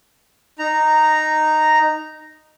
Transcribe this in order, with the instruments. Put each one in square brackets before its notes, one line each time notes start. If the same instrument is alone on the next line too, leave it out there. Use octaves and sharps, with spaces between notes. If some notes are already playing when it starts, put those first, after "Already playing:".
[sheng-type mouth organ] D#4 A#5